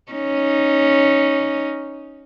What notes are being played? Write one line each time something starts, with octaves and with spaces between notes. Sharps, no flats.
C#4 D#4